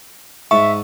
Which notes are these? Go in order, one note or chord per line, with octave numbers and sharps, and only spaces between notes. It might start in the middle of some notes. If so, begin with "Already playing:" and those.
G#2 E5 A5 C#6